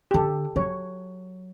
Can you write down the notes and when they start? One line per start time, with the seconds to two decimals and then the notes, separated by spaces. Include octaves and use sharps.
0.11 G4
0.14 D3 A4
0.56 F#3 C#5